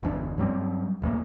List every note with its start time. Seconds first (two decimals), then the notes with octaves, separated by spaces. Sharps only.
0.03 G1 E2 D4
0.38 G2 F#3 G3 C4
1.02 E1 E2 A2 A#3